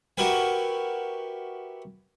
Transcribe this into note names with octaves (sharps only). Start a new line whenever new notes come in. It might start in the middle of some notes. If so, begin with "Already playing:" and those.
E4 F#4 G4 A#4 B4 G#5